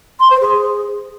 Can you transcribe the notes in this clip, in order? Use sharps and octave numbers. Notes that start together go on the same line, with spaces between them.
C6
C5
G#4